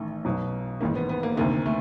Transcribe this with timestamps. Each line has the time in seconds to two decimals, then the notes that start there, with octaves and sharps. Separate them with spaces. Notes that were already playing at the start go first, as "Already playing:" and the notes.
Already playing: A1 D#3 A3
0.25 B1 B2 F#3
0.81 A1 G#2 D#3 A#3
0.95 B3
1.09 B3
1.23 A#3
1.37 D2 C3 D#3 A#3
1.66 A3